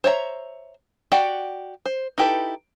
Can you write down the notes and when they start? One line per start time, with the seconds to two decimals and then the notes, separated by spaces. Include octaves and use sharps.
0.04 C5 C#5 E5 A#5
1.12 F#4 G4 D5 F#5 G5
1.86 C5
2.18 D#4 E4 G4 A4 B4